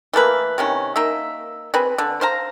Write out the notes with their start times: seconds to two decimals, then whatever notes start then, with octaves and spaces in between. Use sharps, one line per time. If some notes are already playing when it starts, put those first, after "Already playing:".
0.13 E3 A3 A#3 B4
0.58 C3 D#3 C#4
0.96 A#3 D#4 E5
1.74 C4 G#4 B4
1.98 D3
2.21 C5 F5 A#5